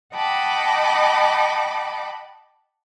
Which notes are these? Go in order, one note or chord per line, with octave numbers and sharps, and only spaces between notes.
D#5 F#5 G5 A5 B5 D6